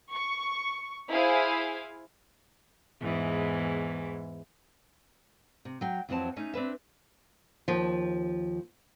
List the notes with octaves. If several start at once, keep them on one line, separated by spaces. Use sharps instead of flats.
C#6
E4 G#4 C5 F5
E2 G#2 E3
C3
F#3 G5
F2 E3 F#3 C4 C5 A5
A3 C#4 D#4
C4 D4 B4 E5
D#2 F3